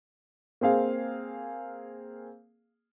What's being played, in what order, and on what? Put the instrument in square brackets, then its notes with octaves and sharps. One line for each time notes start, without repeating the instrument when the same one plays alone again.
[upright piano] A#3 C4 G#4 F5